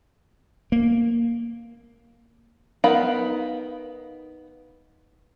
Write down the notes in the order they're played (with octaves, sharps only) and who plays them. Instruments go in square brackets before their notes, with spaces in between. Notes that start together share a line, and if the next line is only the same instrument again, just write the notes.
[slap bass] A#3
[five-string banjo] B3 D#4 A#4 F5 B5